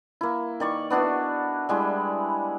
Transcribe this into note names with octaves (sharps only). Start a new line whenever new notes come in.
A#3 E4
D#3 D5 C#6
B3 D4 E4 F#4
G3 G#3 E4